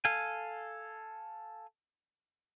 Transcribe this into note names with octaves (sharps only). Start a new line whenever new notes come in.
A4 F5 G#5